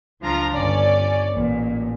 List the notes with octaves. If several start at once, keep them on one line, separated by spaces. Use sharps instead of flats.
C#2 F3 D4 F4 F5 A#5
G1 C#4 D5
A1 A#2